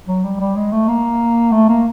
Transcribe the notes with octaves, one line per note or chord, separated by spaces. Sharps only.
F#3
G3
G3
G#3
A3
A#3
A3
A#3